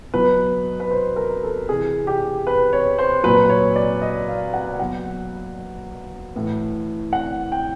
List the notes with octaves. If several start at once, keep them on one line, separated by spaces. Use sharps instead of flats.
B2 F#3 B4
B4
C5
A#4
A4
C3 E3 G#4
G4
B4
C#5
C5
A#2 F#3 B4
C#5
D5
D#5
F5
F#5
B2 F#3 F#5
A2 E3
F#5
G5